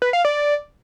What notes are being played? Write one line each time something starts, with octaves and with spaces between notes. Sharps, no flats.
B4
F5
D5